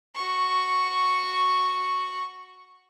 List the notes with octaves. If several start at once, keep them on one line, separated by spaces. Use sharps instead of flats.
F#4 C#6